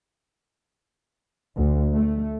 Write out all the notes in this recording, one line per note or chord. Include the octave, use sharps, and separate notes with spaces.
D2
A3